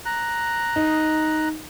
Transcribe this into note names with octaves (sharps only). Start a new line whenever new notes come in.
A#5 F#6
D#4